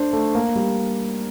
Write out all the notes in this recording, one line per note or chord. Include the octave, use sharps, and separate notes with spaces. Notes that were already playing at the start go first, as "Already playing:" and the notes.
Already playing: A3 D4 C5
A3
A#3
G3